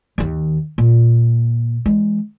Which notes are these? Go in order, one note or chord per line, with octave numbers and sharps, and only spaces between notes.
D#2 D#3
A#2
E3 G#3